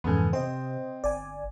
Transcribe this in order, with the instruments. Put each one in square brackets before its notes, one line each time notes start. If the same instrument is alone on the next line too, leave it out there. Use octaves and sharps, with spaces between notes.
[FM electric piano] F2 G#2 C#3 [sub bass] E3 [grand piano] B3 A4 G#5
[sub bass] C3 [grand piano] C4 [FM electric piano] C5 D#5
[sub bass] G1 [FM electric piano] D5 G#5